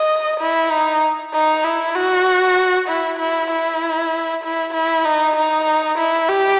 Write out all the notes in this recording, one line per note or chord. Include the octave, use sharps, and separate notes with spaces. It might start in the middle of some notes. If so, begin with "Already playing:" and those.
Already playing: D#5
E4
D#4
D#4
E4
F#4
E4
E4
E4
E4
E4
D#4
D#4
E4
G4